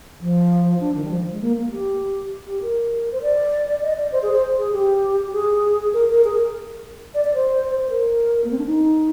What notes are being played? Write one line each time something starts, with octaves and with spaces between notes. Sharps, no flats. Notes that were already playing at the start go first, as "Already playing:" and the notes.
F3
D4
D#3
G3
F3
G#3
A#3
A#3
G4
G4
A#4
C5
D5
D#5
D5
C5
G#4
C5
G#4
G4
G#4
A#4
A#4
G#4
A#4
D5
D5
C5
C5
A#4
A#3
C4
D4
D#4